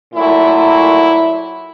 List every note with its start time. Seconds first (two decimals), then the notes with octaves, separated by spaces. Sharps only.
0.14 A#2 F#3 A3 E4